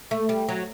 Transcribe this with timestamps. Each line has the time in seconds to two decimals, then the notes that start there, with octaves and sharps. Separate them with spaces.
0.11 A3
0.29 G3
0.49 F#3